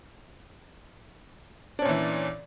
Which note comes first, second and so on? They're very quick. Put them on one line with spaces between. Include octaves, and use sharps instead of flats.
D4 C#4 A#2 E3